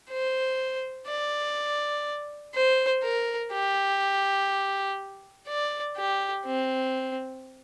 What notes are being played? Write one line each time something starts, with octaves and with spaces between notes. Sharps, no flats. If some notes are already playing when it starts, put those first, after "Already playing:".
C5
D5
C5
A#4
G4
D5
G4
C4